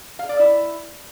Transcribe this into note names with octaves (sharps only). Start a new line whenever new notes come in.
F5
D5
E4